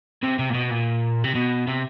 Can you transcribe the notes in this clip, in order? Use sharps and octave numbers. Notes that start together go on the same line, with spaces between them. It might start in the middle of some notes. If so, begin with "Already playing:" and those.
C3
C3
A#2
B2
A#2
C3
B2
C3